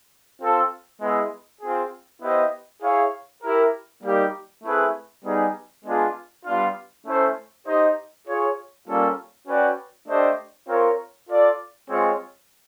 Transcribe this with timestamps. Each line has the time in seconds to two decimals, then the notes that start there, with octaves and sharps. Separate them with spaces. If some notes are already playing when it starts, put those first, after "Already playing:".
0.41 C4 F4 A4
1.01 G#3 B3 E4 G#4
1.62 C4 F4 G#4
2.22 B3 E4 G4 C5 D#5
2.82 E4 G#4 C#5 F5
3.43 E4 G4 A#4
4.03 G3 A#3 D#4 G4
4.64 A3 C4 E4 G#4 B4
5.24 G3 B3 D#4 G#4
5.85 G#3 B3 D4 F4 G#4
6.46 G3 B3 D4 F4
7.06 A3 C#4 E4 A4 C5
7.66 D#4 G4 C5 D#5
8.27 F4 G#4 C#5
8.87 G3 A#3 C#4 F4 A4
9.48 C#4 F#4 B4 D5 G5
10.08 A3 D4 G4 C5 D#5
10.69 C4 F4 A#4 C#5
11.29 F4 A4 D5
11.89 G#3 C4 F4 G#4 C#5